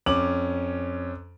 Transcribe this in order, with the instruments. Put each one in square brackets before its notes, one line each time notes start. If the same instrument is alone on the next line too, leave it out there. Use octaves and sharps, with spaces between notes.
[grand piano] F2 C#4 D6 F#7